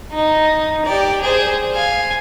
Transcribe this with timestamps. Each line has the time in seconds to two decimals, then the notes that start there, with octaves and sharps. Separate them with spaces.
0.12 D#4
0.85 G4 D5
1.22 G#4 C5
1.73 F5 G#5